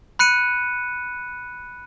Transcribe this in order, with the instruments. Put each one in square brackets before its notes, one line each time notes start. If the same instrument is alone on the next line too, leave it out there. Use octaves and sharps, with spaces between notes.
[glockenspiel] B5 F#6 C#7 D#7